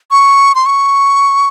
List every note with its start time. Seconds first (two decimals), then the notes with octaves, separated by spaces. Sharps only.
0.11 C#6
0.55 C6
0.66 C#6